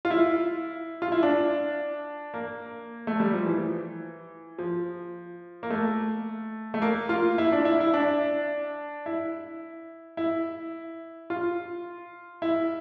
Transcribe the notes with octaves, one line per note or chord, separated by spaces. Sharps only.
F4
E4
F4
E4
D4
A#3
A3
G3
F3
E3
F3
A#3
A3
A3
A#3
F4
E4
D4
E4
E4
D4
E4
E4
F4
E4